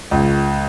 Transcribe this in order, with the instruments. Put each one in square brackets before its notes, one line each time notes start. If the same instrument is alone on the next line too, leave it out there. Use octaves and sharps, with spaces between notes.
[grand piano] C#2